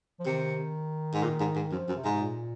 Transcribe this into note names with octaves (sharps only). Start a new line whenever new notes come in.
F3
C3 D#3
G#2
A#2
G#2
G#2
D#3
F#2 F3
F#2
C3
G#2
C3
A#2